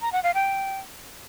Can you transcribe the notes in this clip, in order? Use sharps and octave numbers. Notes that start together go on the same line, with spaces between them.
A#5
F#5
F5
G5